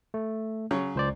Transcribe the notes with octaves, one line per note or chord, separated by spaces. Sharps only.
A3
C#3 F#3
C#2 C5 D5